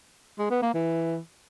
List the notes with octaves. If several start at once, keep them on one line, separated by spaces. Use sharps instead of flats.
G#3
B3
A#3
E3